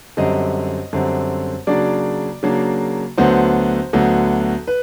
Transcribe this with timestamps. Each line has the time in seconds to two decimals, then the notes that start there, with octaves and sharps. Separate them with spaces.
0.17 F#2 D3 G3 C4 D#5
0.93 F#2 D3 G3 C4
1.67 C#3 F#3 A#3 D4 D5
2.43 C#3 F#3 A#3 D4
3.18 D2 D3 F#3 B3 C5
3.93 D2 D3 F#3 B3
4.67 B4